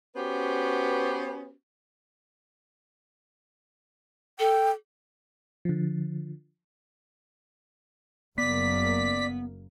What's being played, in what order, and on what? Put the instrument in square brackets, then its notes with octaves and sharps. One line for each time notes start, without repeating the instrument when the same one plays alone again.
[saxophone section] B3 C#4 F#4 G4 B4 C5
[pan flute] A4 [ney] G5
[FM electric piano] D3 F3
[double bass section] F#1 F#2 A#3 [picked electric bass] B3 [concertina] D5 [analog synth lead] B6